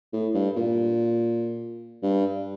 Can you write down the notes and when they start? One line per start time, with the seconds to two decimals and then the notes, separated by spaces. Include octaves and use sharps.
0.13 A2
0.34 G2
0.56 A#2
2.03 G2